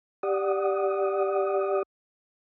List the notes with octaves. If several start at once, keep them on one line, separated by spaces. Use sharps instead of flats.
G4 D5 F#5 D#6